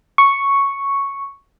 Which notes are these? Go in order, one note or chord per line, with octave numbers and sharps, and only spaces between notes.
C#6